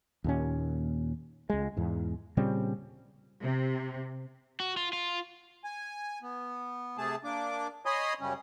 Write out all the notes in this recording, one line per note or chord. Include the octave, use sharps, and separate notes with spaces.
D#2 A#2 C#4
C#2 G#3
E2 G#2
A#2 C#3 G3 C4
C3
F#4
F4
F4
G#5
B3
C3 A3 G#4 A5
A#3 D4 D6
C#5 D#5 G#5 B5 C6 D#6
F#2 C#3 G3 C#4